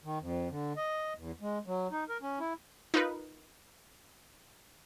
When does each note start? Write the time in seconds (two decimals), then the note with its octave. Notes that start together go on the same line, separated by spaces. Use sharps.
0.04 D#3
0.21 F2
0.49 D3
0.76 D#5
1.16 E2
1.41 G#3
1.67 F#3
1.91 D#4
2.09 A#4
2.22 C#4
2.40 E4
2.94 D#4 F4 A#4 B4